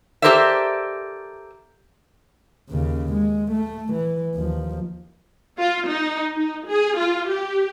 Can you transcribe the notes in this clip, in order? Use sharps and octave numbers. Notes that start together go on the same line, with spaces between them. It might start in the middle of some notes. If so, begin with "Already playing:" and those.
G4 A4 A#4 C5 D5 E5
D#2 C#3
G#3
A3
E3
D#2 F3
F4
D#4
D#4
G#4
F4
G4